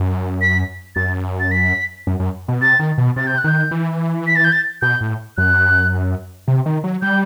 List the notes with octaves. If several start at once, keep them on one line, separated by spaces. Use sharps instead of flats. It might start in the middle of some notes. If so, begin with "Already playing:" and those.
Already playing: F#2
B6
F#2 A6
A6
B6
F#2
F#2
B2
C3 A6
D#3
B2
C3 A6
G6
F#6
D#3 G6
E3
B6
A6
G6
A6
B2 G6
A2
F#2 F#6
C3
D#3
F#3
G3 G6